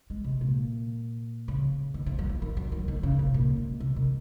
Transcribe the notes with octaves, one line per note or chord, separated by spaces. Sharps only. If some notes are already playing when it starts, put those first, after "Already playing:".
G#3
C3
A#2
C#3
D#3
F3
F#3
F3
D#3
F#3
D#3
D#3
C#3
C3
A#2
G#2
C3
D#3